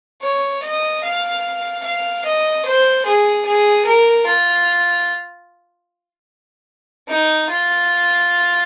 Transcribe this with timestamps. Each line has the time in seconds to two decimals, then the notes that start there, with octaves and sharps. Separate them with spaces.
0.22 C#5
0.63 D#5
1.04 F5
1.84 F5
2.25 D#5
2.65 C5
3.05 G#4
3.45 G#4
3.85 A#4
4.26 F4
7.09 D#4
7.50 F4